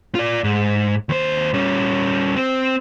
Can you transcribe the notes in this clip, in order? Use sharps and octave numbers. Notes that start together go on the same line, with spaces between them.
F4 D5
G#2
D#2 C5
G3 C#4
C4